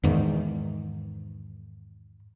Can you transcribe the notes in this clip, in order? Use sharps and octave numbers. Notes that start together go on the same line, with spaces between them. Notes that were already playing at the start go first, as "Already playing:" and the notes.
E2 G#2 D#3